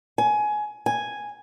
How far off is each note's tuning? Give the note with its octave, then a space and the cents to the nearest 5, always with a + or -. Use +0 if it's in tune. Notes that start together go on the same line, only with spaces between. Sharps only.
G#5 +20
G#5 +0